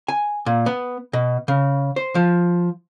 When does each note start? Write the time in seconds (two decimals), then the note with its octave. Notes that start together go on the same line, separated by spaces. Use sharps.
0.08 G#5
0.46 A#2
0.66 B3
1.13 B2
1.48 C#3
1.96 C5
2.15 F3